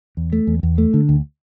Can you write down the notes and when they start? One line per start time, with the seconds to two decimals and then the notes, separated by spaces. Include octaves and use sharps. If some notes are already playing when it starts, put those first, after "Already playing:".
0.17 E2
0.33 A3
0.47 E2
0.63 E2
0.78 A3
0.94 D3
1.09 D2